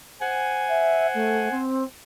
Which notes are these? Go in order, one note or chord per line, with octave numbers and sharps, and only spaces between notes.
C5 F#5 G#5
E5
A3
C4